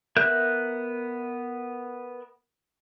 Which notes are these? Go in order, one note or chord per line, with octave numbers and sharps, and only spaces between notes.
B3 A#4 E5 F#6 G6